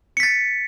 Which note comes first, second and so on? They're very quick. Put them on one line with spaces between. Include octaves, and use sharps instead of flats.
C#7 B6 A6